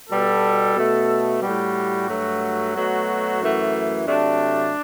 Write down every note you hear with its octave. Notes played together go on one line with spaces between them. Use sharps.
B2 G3 A4
B2 A3
A2 G3 F#4
G2 F#3 A3
B2 F#3 A3
F#2 E3 A3
C3 F#3 A3 D4